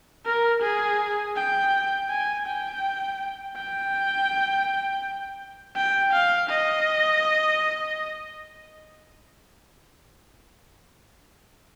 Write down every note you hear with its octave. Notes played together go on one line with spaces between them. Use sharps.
A#4
G#4
G5
G#5
G5
G5
G5
F5
D#5